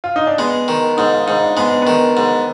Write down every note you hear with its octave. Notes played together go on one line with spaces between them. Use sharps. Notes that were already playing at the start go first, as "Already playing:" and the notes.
F4
D#4
D4
G#3 B3
D#3
G#2 D#4
F4
G#2 D#4
D4
G#3 B3
D4
D#3 B3
G#2